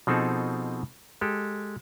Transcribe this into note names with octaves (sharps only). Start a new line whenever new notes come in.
B2 F3 C4 D#4 G#4 A4
G#3 G4 A4